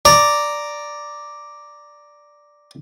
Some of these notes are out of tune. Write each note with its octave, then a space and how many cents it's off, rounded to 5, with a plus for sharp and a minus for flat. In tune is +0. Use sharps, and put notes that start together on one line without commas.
D5 +0 A#5 +0